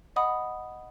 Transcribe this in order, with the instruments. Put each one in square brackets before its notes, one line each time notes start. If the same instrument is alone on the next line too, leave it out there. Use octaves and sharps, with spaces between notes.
[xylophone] D#5 F#5 B5 D#6